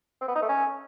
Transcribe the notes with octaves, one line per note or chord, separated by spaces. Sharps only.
C4
B3
D#4
A3
C#4